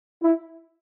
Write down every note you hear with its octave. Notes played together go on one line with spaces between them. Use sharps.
E4